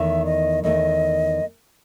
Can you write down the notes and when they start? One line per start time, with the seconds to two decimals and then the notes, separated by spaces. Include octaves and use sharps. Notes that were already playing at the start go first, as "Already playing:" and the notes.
Already playing: E2 D#3 A3 E5
0.26 D#5
0.64 E2 D#3 A3 D#5